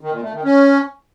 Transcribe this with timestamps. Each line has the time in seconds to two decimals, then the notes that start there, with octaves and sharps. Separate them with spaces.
0.01 D#3
0.12 A#2
0.23 A3
0.34 D#3
0.45 C#4